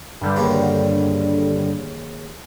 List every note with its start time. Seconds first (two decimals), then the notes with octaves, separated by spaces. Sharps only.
0.21 G2 D3 G3
0.36 D#2 C#3